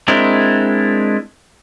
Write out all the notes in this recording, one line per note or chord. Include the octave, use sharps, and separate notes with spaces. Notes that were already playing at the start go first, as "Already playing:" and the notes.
G#3 C4 D4 E4 A#4